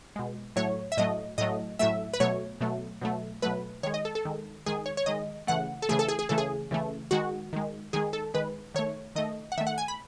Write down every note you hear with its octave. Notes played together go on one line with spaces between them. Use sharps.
B2 G#3
A2 F#3 A3 C#5
E5
A2 F#3 A3 D#5
A2 F#3 A3 D#5
A2 F#3 A3 E5
B4
B2 F#3 A3 C#5
B2 F#3 A3
B2 F#3 A3
B2 F#3 A3 B4
D#3 G#3 C#5
D#5
A4
A4
D#3 G#3
D#3 G#3 G#4
C#5
C#5
D#3 G#3 D#5
C#3 E3 A3 F#5
A4
C#3 E3 A3 G#4
A4
G#4
G#4
C#3 E3 A3 A4
G#4
C#3 E3 A3
D#3 G#3 F#4
D#3 G#3
D#3 G#3 G#4
A4
D#3 G#3 B4
D#3 A3 C#5
D#3 A3 D#5
F#5
D#3 A3 E5
F#5
G#5
B5